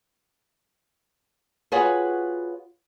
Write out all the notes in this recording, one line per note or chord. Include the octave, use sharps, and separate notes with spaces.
F4 F#4 G#4 B4 C#5